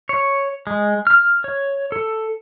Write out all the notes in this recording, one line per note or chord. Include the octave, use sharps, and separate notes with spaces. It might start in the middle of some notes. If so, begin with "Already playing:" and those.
C#5
G#3
F6
C#5
A4